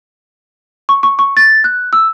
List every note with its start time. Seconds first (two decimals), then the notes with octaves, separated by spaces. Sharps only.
0.89 C#6
1.03 C#6
1.19 C#6
1.37 A6
1.64 F#6
1.93 E6